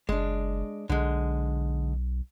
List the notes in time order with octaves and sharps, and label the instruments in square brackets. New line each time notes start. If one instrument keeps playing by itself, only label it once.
[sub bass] F#1 [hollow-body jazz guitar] G#3 D4
[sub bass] B1 [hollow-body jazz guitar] D3 G#3